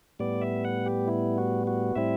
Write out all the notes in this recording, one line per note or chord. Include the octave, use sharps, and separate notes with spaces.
A2 G3 B3 D5
E5
F#5
G4
E4
F#4
F#4
A2 G3 C4 E4 E5